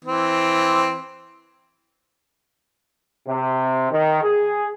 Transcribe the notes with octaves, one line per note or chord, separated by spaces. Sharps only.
E3 C4
C3
D#3
G#4